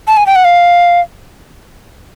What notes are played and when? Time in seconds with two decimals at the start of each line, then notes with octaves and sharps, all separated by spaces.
0.08 A5
0.17 G#5
0.26 G5
0.36 F#5
0.45 F5